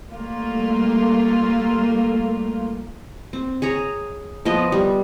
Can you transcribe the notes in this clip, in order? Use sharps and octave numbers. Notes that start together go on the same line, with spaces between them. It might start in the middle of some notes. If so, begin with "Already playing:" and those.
G3 A3 A#3 F4
C4
G#4 C#5 A#5
F3 B3 D#5
G3